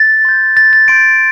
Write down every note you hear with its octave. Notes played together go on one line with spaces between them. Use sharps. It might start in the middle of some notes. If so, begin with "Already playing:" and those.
Already playing: A6
C6 G6
A6
A6
C6 G6 D7